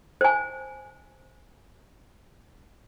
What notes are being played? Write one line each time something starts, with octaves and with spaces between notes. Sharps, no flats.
C5 G#5